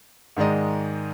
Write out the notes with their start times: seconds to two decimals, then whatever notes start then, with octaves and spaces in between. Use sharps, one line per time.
0.37 G#2 D#3 G#3 D5 D#5